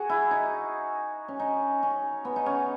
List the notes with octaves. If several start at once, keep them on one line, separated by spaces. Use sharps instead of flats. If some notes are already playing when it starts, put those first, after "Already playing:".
Already playing: F#4 G#4
E4
D#4
C#4
D#4
C#4
B3
D#4
C#4